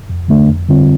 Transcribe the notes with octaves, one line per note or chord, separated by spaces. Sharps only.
F2
D3 A3 D4
F2
D3 G3 C4 F4